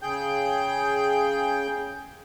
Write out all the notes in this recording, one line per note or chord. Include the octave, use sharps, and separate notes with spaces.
C#3 G#4 G5 G6